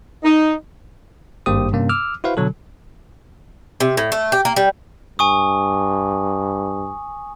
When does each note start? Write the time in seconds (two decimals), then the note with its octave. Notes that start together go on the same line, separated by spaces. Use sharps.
0.24 D#4
1.46 G#1 G2 A#3 G4 C5 D#6
1.72 G2 C3 A#3 C#4
1.89 D6 E6 F6
2.24 E4 F#4 B4 C5 F5
2.37 B2 D3 F#3 A4
3.80 C3
3.97 A2
4.12 A3
4.32 G4
4.45 A#3
4.56 G3
5.19 G2 G#5 C#6 D#6